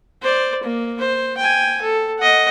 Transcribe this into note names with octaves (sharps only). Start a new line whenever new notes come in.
C5 D5
A#3
C5
G5 G#5
A4
D#5 F#5